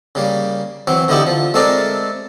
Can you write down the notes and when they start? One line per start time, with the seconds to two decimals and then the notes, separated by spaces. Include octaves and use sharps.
0.15 C#3 G3 A#3
0.87 E3 F#3 C4
1.08 D3 B3 D#4 E4 G4
1.27 F3
1.54 G#3 A3 C4 A4 A#4 D5